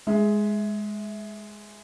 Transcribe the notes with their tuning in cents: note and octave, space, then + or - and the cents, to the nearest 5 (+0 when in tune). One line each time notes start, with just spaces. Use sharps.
G#3 +5 E5 -15